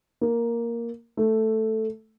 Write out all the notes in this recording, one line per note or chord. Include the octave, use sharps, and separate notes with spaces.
A#3
A3